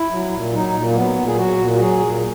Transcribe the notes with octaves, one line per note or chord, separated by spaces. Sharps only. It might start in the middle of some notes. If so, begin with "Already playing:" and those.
Already playing: E4
F#3
A#2
F#3 D#4
A#2
A#3
F#3 B3
A#2
G#4
F#3 F#4
A#2
F#4
F#3 G#4
A#2